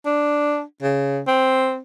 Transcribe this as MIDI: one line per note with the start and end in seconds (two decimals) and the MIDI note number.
0.06 0.62 62
0.82 1.20 49
1.28 1.79 60